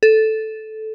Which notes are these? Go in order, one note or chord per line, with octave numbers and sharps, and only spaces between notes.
A4